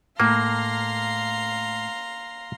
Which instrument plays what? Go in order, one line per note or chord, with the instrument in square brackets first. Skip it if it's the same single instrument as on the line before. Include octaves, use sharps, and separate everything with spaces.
[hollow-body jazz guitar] A2 [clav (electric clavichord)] A#3 [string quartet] F5 A#5 C6